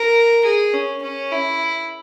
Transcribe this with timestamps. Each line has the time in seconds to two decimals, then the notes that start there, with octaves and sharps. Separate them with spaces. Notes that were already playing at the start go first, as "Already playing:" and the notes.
Already playing: A#4
0.45 G#4
0.74 C#4
1.02 C#4
1.32 E4